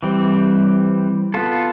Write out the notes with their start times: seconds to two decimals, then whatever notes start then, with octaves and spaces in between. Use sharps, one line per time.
0.03 E3 G3 C4
1.34 B3 F4 A4